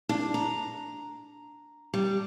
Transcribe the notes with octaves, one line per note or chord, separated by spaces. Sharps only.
D4
A#5
G3